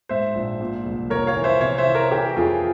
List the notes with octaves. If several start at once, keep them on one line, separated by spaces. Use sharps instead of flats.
G#2 C5 E5
A#1
A#2
C2
F1 A#4 C#5
C#5 F5
E3
C5 E5
C3 C#5 F5
C5 E5
E3
A#4 C#5
E3 G4 A#4
F2 F4 G#4